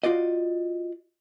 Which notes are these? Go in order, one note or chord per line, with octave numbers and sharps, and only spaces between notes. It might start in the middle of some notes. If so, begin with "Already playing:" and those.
F4 F#4 D5 D#5